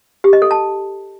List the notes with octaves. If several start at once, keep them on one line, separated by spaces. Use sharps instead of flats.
G4
D#5
A4
A5